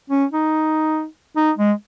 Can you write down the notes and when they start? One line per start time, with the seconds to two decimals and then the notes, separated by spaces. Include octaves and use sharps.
0.10 C#4
0.32 D#4
1.37 D#4
1.57 G#3